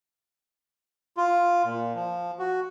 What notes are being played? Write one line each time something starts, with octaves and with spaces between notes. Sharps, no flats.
F4
A#2
F3
F#4